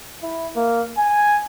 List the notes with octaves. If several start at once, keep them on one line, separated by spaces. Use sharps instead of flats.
E4
A#3
G#5